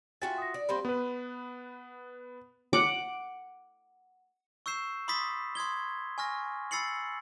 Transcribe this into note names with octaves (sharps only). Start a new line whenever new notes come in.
F4 F#4 E5 G5 G#5 A6
D#6 A#6
D5
G3 A#3 C4 B5 C6
B3 B4
F#5 D6
C#6 E6 G6 C7 E7
B5 C6 D6 D#6 A6 B6
C6 D#6 G#6 G7
G#5 C#6 F6 A#6
B5 E6 A6 C7 C#7 F#7